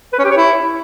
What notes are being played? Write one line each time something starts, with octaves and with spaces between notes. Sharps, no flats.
B4
C#4
G4
C#5
E4